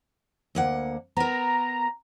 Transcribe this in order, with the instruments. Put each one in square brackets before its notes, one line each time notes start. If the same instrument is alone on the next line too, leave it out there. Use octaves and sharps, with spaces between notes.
[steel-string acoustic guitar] D2 A#3 F#5
[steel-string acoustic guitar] B3 A#4 [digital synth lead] A#5